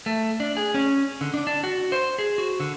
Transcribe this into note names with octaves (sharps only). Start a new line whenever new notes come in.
A3
D4
G#4
C#4
D3
D4
D4
F#4
C5
G#4
F#4
D3